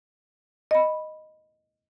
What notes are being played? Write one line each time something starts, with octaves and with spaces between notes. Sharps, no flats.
D#5 B5